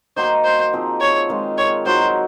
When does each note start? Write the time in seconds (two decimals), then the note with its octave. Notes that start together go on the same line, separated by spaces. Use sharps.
0.16 D#3 A#3 D#4 F#4 C5
0.45 C5
0.73 F3 C4 D#4 G#4
1.01 C#5
1.29 D#3 G#3 C4 F4
1.58 C#5
1.85 F#3 C4 D#4 F#4 C5